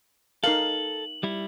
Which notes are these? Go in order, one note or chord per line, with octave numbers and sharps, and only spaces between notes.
D#4 A4 A#4 F5 F#7
G3 E4